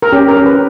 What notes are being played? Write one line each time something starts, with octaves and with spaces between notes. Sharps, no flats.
A#4
C#4 G4
A#4
C#4
B4